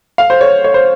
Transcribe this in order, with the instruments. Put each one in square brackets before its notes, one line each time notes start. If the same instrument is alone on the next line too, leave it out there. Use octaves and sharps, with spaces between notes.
[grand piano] F5
C5
C#5
C#5
C5